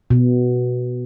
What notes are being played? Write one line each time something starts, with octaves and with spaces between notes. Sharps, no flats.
B2